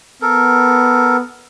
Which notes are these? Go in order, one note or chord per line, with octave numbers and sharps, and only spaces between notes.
B3 A4 A#4